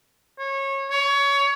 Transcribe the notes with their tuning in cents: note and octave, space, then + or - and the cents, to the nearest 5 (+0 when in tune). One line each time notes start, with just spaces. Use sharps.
C#5 -25
C#5 +20